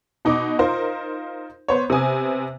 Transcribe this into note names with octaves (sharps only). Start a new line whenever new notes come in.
B2 D#4 D6
D#4 F4 A#4 C5
B3 C5 C#5
C3 B3 G#5 D#6